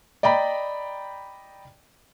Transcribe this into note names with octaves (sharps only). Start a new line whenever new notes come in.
D5 D#5 G5 A#5 B5